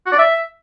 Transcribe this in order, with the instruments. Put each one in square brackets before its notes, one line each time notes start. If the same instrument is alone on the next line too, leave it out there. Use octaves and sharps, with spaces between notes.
[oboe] F#4
D5
E5